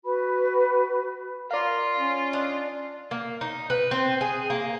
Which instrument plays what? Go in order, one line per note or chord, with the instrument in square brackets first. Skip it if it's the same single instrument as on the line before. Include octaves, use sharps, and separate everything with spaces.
[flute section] F#4 B4 B5
[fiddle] F4 [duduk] A#4 [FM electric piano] D5 F5
[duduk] C#4
[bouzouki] D4 D#5
A#3
D#4
B4
C4
G#4
A#3